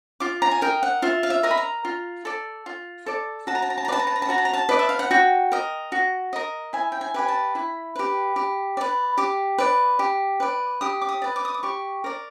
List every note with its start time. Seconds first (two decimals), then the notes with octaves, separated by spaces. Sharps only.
0.20 F4 D6
0.42 A#5
0.51 G#5
0.61 A#4 D#5 G5
0.83 F#5
1.02 F4 E5
1.23 F5
1.30 E5
1.43 A#4 D#5
1.51 B5
1.57 A#5
1.85 F4
2.25 A4 D5
2.66 F4
3.06 A4 D5
3.47 F#4 A5
3.55 A#5
3.62 A5
3.70 A#5
3.78 A5
3.85 A#5
3.88 B4 D5
3.92 A5
3.99 A#5
4.07 A5
4.16 A#5
4.22 A5
4.29 F#4 A#5
4.38 A5
4.45 A#5
4.53 A5
4.69 B4 D5 D#5
4.79 E5
4.89 F5
4.99 F#5
5.11 F#4 G5
5.52 A#4 D#5
5.92 F#4
6.33 A#4 D#5
6.73 E4 G#5
6.92 G5
7.01 G#5
7.14 G4 B4 G#5
7.28 A5
7.55 E4 B5
7.96 G4 B4
8.36 G4
8.77 B4 D5
9.18 G4 D6
9.58 B4 D5
9.99 G4
10.40 B4 D5
10.81 G4 D#6
11.02 D6
11.09 D#6
11.22 B4 D5
11.36 D6
11.45 D#6
11.54 D6
11.63 G4 C#6
12.04 A#4 D5